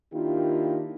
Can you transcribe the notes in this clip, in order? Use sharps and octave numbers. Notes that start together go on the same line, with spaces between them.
D#3 A#3 D4 E4 F4 G4